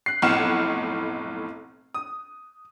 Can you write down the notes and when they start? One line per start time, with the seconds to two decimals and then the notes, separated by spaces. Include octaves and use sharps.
0.06 F#6 C7
0.22 F1 B1 A2 F#5 F6 E7
1.94 D#6